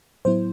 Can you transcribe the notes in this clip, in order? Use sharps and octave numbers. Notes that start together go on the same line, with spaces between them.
A2 F#3 B3 E4 C5